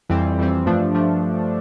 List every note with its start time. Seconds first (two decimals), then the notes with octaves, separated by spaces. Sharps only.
0.09 F2 E3 G3 C4
0.39 F2 E3 G3 C4
0.66 G2 F3 A3 D4
0.95 F3 A3 D4